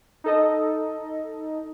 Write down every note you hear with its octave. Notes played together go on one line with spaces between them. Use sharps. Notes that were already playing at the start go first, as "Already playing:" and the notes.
D#4 A4 D#5